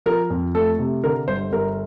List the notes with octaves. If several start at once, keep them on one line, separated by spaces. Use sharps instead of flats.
F3 A#4
F2
A3 A4
C3
D3 A#4
G1 C5
G1 A#4